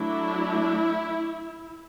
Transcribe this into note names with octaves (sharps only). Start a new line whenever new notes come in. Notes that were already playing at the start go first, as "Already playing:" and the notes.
Already playing: F#3 A3 D4 E4